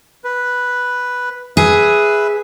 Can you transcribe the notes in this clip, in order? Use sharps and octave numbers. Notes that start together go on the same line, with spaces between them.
B4
G#4 B4 E5